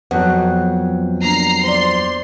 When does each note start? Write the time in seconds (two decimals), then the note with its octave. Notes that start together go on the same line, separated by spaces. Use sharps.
0.11 F2 F#3 B3 F#5
1.22 A#3 D4 A#5 C7
1.64 C5 D5 C6